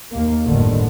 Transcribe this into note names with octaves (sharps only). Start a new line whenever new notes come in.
D#2 A#3
G1 F#2 A2 D3 D#3